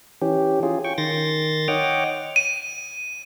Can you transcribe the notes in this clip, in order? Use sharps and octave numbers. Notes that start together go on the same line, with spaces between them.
E3 C#4 G4
C#4 F4 G#4
G5 C#6
D#3 C6 A6 A#6
C#5 D#5 F#5 G5 D6 F6
D#7